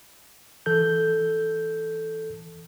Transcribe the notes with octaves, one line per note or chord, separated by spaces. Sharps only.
E3 A4 G6